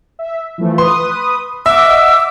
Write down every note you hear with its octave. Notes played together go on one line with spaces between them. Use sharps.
E5
E3 F3 A3
B4 C6 D#6
D#5 E5 F#5 D6 E6